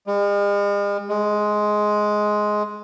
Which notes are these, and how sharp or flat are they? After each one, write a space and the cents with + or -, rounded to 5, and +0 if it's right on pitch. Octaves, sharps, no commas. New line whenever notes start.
G#3 -45
G#3 +10